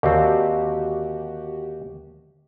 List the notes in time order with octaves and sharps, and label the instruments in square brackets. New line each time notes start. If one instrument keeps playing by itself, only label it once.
[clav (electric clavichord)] D#2 C4 [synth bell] D3 [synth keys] F#4 G4